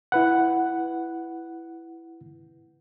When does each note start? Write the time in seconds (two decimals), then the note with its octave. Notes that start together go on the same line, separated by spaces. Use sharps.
0.12 E4 B4 F#5